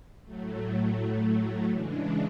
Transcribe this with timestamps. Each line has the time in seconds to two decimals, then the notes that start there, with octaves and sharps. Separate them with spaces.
0.24 A2 F#3 A3
1.70 C#3 E3 G#3 D4